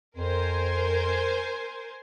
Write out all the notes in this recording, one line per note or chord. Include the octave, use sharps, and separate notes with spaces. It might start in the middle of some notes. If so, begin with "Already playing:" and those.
F2 A#4 C5 G#5